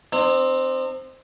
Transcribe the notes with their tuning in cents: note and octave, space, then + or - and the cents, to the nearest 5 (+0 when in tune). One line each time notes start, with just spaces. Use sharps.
C4 +0 D#4 -45